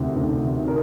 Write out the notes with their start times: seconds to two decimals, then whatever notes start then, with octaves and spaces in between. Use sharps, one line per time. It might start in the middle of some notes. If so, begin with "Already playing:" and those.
Already playing: D2 C3 D#3
0.16 D2
0.43 C3 D#3
0.68 A#4